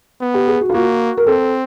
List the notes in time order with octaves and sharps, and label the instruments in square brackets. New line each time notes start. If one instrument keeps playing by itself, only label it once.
[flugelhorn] B3
[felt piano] G4
G#4
F#4
F4
[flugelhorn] A#3 [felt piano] F#4
[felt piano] A#4
[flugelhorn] C4 [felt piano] A4